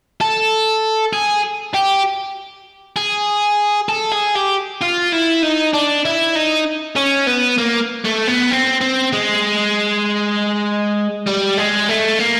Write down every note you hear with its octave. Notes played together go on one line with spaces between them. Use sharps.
A4
G#4
G4
G#4
A4
G#4
G4
F4
E4
D#4
D4
E4
D#4
C#4
B3
A#3
A3
B3
C4
C4
G#3
G3
G#3
A3
A#3